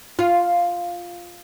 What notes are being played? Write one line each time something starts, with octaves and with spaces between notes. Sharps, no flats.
F4